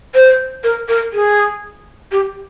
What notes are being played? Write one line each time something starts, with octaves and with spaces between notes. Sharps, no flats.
C5
A#4
A#4
G#4
G4